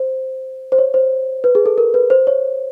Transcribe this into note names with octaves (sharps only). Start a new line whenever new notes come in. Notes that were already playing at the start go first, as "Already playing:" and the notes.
Already playing: C5
C5
C#5
C5
B4
G#4
A4
A#4
B4
C5
C#5